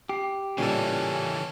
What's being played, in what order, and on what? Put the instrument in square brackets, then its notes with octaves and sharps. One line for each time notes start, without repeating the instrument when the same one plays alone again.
[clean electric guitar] G4 [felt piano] C7
[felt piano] A1 A#2 G3 [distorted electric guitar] C#3 E3 [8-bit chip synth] C#4 A4